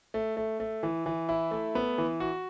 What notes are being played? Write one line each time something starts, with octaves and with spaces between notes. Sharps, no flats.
A3
A3
A3
E3
E3
E4
A3
B3
E3
F#4